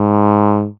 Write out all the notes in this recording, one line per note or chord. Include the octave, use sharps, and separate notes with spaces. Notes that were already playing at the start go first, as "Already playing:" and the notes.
Already playing: G#2